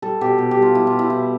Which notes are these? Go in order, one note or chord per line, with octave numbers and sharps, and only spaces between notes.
G3 A4
B2 G4
B2 G4
G4
G3 F4
G3 E4
F4
B2
E4
B2 E4